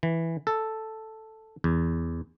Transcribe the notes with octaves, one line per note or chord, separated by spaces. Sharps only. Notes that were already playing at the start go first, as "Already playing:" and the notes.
E3
A4
E2